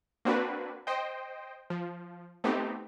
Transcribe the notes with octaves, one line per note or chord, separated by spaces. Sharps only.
A#3 C4 D4 F#4 B4
C5 D#5 G5
F3
A3 B3 C4 D#4 G4